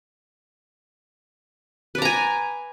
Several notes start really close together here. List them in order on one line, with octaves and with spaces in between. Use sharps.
B4 D5 A#5 G#5